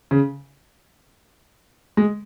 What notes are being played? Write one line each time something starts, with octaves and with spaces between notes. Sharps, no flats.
C#3
G#3